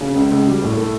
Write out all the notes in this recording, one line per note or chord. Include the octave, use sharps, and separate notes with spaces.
C#3
C#2
C#2
G3
A2
A3